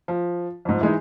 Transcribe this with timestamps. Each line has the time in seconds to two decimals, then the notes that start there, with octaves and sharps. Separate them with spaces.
0.08 F3
0.65 F2 G#2
0.81 E3 G#3 D#4